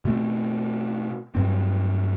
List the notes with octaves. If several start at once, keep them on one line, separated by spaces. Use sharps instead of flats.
B2 A3 C4
G2 F#3 C4